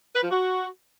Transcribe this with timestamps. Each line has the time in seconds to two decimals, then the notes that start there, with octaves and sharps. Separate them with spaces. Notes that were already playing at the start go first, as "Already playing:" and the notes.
0.15 B4
0.23 F3
0.31 F#4